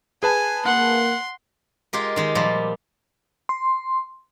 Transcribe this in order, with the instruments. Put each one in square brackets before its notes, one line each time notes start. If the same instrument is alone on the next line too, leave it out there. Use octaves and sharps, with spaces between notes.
[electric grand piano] G#4 B4 A5 [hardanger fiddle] G#5
[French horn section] A#3 [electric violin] F#5 [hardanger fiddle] C6
[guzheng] G#3 F4 G4 A#4
D#3 G#3 G4
A#2 F3 G3
[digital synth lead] C6